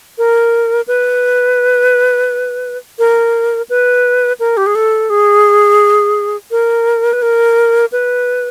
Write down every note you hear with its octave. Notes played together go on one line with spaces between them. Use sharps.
A#4
B4
A#4
B4
A#4
G4
G#4
A4
G#4
A#4
B4
A#4
B4